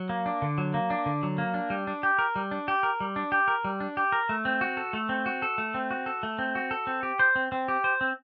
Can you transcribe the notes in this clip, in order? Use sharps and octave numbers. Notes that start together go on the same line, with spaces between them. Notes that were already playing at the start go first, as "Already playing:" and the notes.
Already playing: F#3
A#3
D4
D3
F#3
A#3
D4
D3
F#3
A#3
D4
G3
D4
G4
A#4
G3
D4
G4
A#4
G3
D4
G4
A#4
G3
D4
G4
A#4
A3
C4
F#4
A4
A3
C4
F#4
A4
A3
C4
F#4
A4
A3
C4
F#4
A4
C4
G4
C5
C4
C4
G4
C5
C4